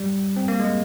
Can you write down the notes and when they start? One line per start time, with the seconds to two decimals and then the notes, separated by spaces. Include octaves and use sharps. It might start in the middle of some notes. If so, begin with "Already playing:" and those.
Already playing: G3
0.37 C4
0.48 A#3
0.60 G#3